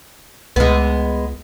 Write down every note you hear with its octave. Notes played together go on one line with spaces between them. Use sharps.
C#2 G#3 B3